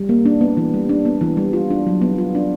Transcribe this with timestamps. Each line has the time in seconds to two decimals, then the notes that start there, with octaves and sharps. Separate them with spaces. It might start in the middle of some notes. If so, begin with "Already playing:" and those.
Already playing: G3
0.09 A#3
0.25 D4
0.41 B3
0.57 E3
0.74 G3
0.89 D4
1.05 B3
1.21 E3
1.37 G3
1.53 F4
1.70 D4
1.87 F#3
2.01 B3
2.18 F4
2.35 D4